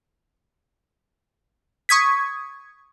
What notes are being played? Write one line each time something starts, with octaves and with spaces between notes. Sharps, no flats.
C#6 D#6 G#6 B6